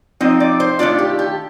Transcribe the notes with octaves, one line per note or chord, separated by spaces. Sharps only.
F3 C4 D#4 D#5
D5
C5
D#3 A3 D4 F4 D5
G4
G4